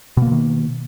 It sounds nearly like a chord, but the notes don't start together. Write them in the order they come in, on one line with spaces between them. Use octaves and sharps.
B2 A#3 D3 D#3